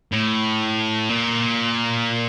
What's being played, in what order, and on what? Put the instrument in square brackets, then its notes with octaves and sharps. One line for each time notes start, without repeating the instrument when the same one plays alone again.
[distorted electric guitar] A2
A#2